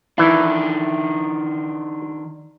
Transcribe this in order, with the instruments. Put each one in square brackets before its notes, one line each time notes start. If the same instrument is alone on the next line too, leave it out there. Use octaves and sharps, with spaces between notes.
[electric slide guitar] D#3 D4 [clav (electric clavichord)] E3 E4